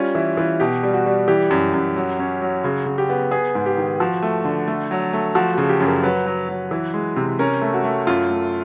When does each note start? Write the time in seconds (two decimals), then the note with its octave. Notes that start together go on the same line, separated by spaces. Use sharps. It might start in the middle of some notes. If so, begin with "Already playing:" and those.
Already playing: G3 C#4 F4
0.15 E3 E4
0.37 E3 F4
0.60 B2 G4
0.83 G3
0.94 F#4
1.06 G3
1.28 E3 G4
1.51 F#2
1.74 F#2
1.96 F#3
2.19 C#4
2.42 F#3
2.64 C#3 F#4
2.86 C#3
2.98 G4
3.09 B3
3.31 B3 G#4
3.55 G#2
3.66 G4
3.77 D#3
4.00 F3 F#4
4.22 A3
4.45 D3
4.68 A3
4.91 F#3
5.13 A3
5.35 F3 F#4
5.53 C#3 F#4
5.69 G4
5.80 F#2
5.87 A#4
6.03 F#3 B4
6.26 F#3
6.49 F#3
6.71 E3
6.94 G#3
7.16 C3
7.39 C#4 A#4
7.61 A3
7.74 F#4
7.84 A3
8.07 F#2 F4
8.30 A3